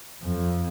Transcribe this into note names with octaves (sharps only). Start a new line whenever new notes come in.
F2